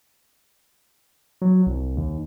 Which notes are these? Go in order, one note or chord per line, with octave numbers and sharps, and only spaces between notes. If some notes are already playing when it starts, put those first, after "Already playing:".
F#3
C2
D#2